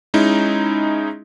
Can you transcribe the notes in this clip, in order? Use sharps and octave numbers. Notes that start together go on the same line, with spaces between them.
G#3 C#4 D#4 E4